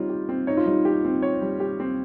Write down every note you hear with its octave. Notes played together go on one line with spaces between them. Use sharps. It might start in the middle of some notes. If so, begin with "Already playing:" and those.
Already playing: G3 C4 D#4 F4 C#5
G4
C4
D#4 C#5
F4
G3 D#4
G4
C4
C#5
G3
G4
C4